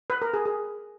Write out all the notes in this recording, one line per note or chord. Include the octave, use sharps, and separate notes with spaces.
B4
A#4
G#4
G#4